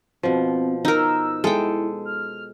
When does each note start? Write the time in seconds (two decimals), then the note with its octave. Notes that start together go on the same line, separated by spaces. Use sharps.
0.23 B2 F3 C4
0.85 D#4 A#4 E6
1.44 G#3 E4 A4 G5
2.05 F6